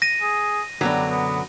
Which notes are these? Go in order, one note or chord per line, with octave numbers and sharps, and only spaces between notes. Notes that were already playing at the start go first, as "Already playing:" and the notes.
A#6 D#7
G#4
F#2 B2 D3 F#3 G3
B3